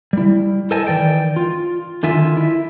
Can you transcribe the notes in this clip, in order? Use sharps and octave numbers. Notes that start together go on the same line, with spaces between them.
G3 E4
A4 A#4 C5 D#5 G#5 A5
D#3 E3 D5 G5
F4
D3 D#3 F4 E5 G#5
E4 E5